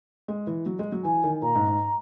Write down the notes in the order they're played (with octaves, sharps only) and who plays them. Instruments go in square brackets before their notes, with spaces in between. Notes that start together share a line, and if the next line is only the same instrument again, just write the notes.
[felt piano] G#3
E3
F#3
G#3
F#3
[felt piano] E3 [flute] G#5
[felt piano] D#3
[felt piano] A#2 [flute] A#5
[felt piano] G#2
G#2